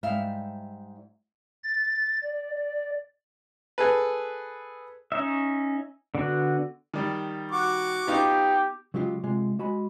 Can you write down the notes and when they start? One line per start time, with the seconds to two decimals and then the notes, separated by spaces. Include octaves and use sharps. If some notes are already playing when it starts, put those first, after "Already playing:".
0.03 G#2 G3 E5 F5
1.64 A6
2.23 D5
2.58 D5
3.78 G#4 A4 B4
5.12 C#4 D#4 E5
6.15 D3 B3 F#4
6.94 D#3 G3
7.51 F#4 C#6 D6
8.07 B3 D#4 F4 G4
8.94 C#3 F#3 G#3 F4 G4
9.23 C3 G#3 F4
9.59 G#3 F#4 G#5 B5